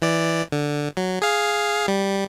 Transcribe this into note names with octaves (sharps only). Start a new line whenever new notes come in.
E3 D5
D3
F#3
G#4 F5
G3